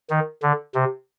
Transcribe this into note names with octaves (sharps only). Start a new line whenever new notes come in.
D#3
D3
C3